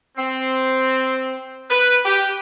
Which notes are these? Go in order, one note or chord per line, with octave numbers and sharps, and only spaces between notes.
C4
B4
G4